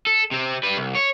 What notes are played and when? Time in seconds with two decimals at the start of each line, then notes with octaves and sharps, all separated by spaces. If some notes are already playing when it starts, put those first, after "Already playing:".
0.07 A4
0.31 C3 C4
0.63 G3 B4
0.77 C2
0.95 C#5